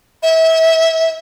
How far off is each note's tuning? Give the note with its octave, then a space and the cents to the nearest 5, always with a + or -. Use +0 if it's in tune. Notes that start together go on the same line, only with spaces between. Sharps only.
E5 -25